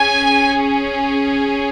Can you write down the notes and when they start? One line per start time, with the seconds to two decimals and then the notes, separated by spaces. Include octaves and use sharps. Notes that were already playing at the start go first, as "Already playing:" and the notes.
Already playing: C#4 G#4 G#5